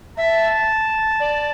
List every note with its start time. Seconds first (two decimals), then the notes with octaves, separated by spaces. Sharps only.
0.17 E5 A5
1.20 D5